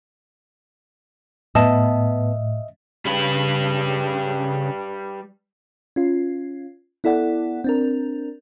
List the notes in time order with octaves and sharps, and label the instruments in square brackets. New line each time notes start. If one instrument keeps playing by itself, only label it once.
[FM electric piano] A2 [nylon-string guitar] B3 A5 [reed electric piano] D#5 E5
[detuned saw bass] C#3 [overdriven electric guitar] G3 B4
[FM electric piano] C#4 F4
B3 E4 A4 D5 F#5
C4 D4 A#4